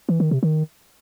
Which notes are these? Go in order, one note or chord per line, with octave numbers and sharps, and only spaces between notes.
E3
D#3
C3
D#3